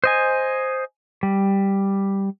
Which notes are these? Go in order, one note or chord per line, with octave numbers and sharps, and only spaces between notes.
C5 D#5 G#5
G3